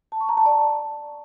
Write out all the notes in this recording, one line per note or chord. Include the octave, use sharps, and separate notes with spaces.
A5
C#6
A#5
A5
D5